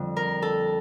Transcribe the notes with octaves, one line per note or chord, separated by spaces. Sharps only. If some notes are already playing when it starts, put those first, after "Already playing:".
Already playing: F2 D3 G3
A#4
A4